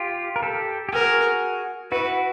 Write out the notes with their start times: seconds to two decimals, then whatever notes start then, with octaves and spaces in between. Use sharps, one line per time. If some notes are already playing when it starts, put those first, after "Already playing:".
Already playing: F4 G4
0.36 A#4
0.43 G4 A4
0.89 G4
0.93 F#4 G#4 A#4
1.92 E4 F#4 B4